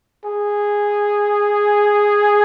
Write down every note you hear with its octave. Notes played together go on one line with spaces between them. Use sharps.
G#4